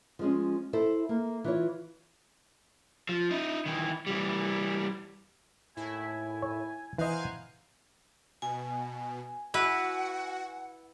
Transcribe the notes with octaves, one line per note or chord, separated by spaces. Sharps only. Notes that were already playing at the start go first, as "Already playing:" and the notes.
F3 G#3 C#4
E4 A4 C5
A#3
E3 F4 C#5
F3
D#4 E4
D#3 E3
E3 G3
D#2 A2 E4 E5 G#5
C#5
E3 B3 A#4 C5 D#5 F5 G#5 F#6
B2 G#5
E4 F#4 B4 F#5